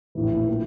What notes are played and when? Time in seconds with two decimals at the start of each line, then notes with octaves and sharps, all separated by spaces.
0.15 A#1 A2 E3
0.49 F3 A#3